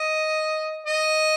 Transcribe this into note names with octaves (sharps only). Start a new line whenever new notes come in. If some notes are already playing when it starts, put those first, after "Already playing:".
Already playing: D#5
D#5